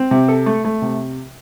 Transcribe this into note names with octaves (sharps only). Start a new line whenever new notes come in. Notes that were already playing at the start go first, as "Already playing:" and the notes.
Already playing: C4
C3
A4
A3
A3
C3